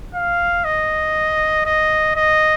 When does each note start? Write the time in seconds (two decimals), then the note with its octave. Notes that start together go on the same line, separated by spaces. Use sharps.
0.15 F5
0.64 D#5
1.66 D#5
2.15 D#5